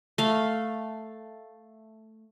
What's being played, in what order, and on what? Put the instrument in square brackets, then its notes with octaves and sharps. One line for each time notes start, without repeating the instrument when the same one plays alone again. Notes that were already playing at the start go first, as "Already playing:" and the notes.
[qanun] A3 F5